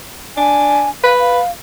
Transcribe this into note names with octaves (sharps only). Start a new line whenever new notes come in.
D4 G#5
B4 F5
F5